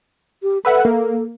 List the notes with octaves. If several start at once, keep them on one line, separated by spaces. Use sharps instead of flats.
G4
A4 B4 E5 F#5
A#3